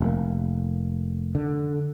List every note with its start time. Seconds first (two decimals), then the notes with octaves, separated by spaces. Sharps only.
0.01 F1 A#3
1.35 D3